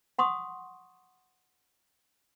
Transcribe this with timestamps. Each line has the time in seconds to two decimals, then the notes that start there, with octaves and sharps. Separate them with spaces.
0.19 F#5 C6 C#6 D#6